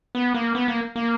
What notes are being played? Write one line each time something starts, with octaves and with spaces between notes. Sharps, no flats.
B3
A#3
B3
A#3
A#3